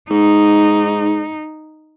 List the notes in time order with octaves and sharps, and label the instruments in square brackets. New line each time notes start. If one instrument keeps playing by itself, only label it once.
[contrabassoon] G#2 [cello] D#4